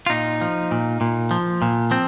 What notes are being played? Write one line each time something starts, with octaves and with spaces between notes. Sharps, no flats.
F4
A#2 D#4
F3
A#2
A#2
F3
A#2
F3 C4